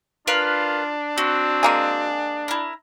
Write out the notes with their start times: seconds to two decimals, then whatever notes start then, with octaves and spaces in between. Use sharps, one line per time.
0.27 D4 F4 A#4 B4 F5
1.18 C4 F#4
1.63 G#3 A#3 G#4
2.48 E4 A#4